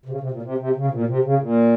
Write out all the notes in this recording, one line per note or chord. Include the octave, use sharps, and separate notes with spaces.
C3
C#3
C3
A#2
C3
C3
C#3
C3
A#2
C3
C#3
A#2